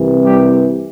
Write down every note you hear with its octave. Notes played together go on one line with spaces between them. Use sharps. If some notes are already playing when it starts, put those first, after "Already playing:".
Already playing: C2 C3 E3
G3 G4